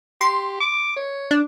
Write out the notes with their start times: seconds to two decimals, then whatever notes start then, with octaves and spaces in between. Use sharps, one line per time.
0.21 G4 C6
0.60 D6
0.96 C#5
1.31 D4